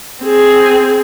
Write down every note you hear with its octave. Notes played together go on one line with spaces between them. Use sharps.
C4 G#4